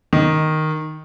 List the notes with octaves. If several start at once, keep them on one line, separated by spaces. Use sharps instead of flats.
D#3